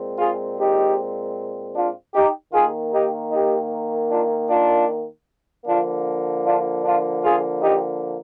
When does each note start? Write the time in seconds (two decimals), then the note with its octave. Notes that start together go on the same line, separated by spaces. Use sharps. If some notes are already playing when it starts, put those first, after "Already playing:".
Already playing: A#2 G#3 C4
0.18 F4 G#4
0.57 D#4 G4
1.74 D4 F4
2.13 D#4 G4
2.53 D#3 A#3 F4 G#4
2.92 D#4 G4
3.31 D#4 G4
4.09 D4 F4
4.48 D4 F4
5.66 D3 F3 A#3 D4 F4
6.44 D4 F4
6.83 D4 F4
7.23 F4 G#4
7.61 D#4 G4